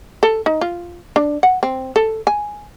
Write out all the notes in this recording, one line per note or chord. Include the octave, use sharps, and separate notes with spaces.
A4
D#4
F4
D4
F#5
C4
A4
G#5